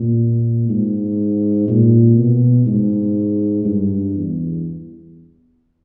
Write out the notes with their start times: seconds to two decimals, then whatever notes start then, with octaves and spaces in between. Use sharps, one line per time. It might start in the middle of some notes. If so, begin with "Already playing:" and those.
Already playing: A#2
0.69 G#2
1.68 A#2
2.18 B2
2.66 G#2
3.65 G2
4.15 E2